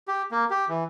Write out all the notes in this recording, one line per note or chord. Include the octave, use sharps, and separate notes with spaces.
G4
A#3
G4
E3